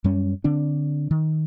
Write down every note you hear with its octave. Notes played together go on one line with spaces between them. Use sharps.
F#2 G3 C#4
D3 C4 D4
D#3